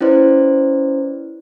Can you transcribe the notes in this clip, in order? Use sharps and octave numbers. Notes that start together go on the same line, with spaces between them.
C#4 E4 B4 C5 D5